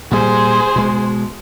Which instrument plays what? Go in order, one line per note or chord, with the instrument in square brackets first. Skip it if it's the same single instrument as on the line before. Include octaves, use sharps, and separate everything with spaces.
[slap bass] A#2 G3 [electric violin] G#4 C5
[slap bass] B2 G#3